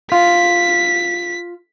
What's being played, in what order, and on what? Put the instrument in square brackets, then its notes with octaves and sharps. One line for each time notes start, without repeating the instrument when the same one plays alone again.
[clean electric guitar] F4 [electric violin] B6